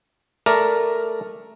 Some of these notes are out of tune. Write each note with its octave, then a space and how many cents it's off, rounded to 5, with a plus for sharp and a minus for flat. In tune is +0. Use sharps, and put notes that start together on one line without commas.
A3 +0 A#4 +0 D5 +0